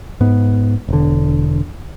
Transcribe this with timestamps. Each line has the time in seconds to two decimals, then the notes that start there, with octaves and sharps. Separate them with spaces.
0.21 G#2 B3
0.89 E1 D3